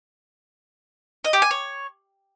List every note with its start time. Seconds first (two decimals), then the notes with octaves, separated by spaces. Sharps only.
1.24 D#5
1.33 G4
1.42 G#5
1.51 C#5